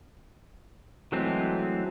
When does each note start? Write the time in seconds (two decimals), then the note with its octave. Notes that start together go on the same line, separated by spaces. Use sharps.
1.12 E3 F#3 G#3 A3 C4